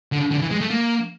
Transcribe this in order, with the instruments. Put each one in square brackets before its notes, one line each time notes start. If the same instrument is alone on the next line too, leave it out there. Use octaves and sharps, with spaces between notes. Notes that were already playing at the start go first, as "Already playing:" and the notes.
[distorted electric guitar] D3
D3
E3
G#3
A3
A#3